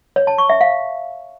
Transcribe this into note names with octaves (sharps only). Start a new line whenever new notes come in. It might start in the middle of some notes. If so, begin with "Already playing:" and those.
C#5
A5
C#6
E5
F5